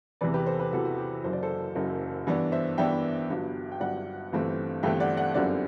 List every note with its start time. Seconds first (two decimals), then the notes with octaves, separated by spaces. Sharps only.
0.21 E2 C3 E3 B4 D5
0.34 G4 B4
0.46 A4 C5
0.59 G4 B4
0.72 E2 C3 E3 F#4 A4
0.85 F#4
0.98 G4
1.24 F#1 F#2 F#3 C5
1.33 D5
1.43 A4 C5
1.75 F#1 F#2 F#3
2.27 G2 E3 B3 D4
2.52 C5 E5
2.78 G2 E3 B3 D4 E5 G5
3.30 G1 G2 F#3
3.72 G5
3.80 G1 G2 F#3 D5 F#5
4.32 G1 G2 E3 A3 C4
4.83 G1 G2 E3 A3 C4 E5 G5
5.00 D5 F#5
5.17 D5 F#5
5.34 G1 F#2 D3 G3 C4 D5 F#5